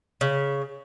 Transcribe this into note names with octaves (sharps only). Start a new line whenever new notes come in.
C#3